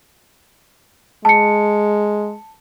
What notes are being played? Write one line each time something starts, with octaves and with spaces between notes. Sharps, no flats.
G#3 A5 C#7